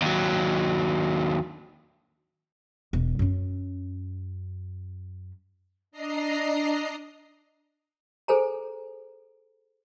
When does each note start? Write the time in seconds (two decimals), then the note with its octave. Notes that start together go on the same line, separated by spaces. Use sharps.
0.02 D#2 F#3
2.93 E1
3.19 F#2 C#4
5.92 D4 D#5 A#5 C7
8.28 G#4 A4 C5 G#5 A#5